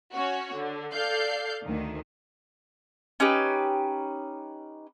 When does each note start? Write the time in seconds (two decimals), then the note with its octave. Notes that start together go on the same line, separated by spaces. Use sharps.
0.12 C#4 F#4 C#5
0.53 D3
0.93 A4 D5 F5 G6 C7
1.65 D2 D#3
3.20 C#4 D#4 G4 B4